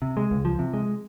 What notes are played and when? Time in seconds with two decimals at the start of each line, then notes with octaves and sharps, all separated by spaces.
0.02 C3
0.17 G#3
0.31 C#2
0.45 F3
0.59 C3
0.74 G#3